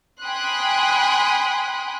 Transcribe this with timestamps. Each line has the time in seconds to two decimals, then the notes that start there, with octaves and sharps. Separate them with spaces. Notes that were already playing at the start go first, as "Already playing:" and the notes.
0.22 G5 G#5 B5 C6 D#6 F#6